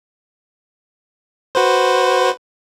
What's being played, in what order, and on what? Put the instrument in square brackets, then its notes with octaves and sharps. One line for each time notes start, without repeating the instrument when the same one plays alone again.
[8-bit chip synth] F#4 B4 C5